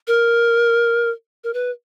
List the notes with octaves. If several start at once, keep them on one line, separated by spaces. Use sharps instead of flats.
A#4
A#4
B4